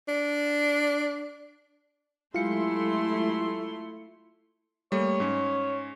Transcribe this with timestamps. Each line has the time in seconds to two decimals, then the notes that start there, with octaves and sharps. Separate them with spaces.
0.08 D4
2.34 F#3 G#3 A3 E4 F4 G4 C6 C#7
4.92 G3 A3 A#3 C#5
5.20 G#2 C#4